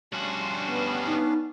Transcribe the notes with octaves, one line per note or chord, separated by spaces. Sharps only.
G2 C#4 D4 F#4 F5 C6
B3
D#4